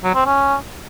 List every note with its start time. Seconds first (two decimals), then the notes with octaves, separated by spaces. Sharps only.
0.03 F#3
0.15 C4
0.26 C#4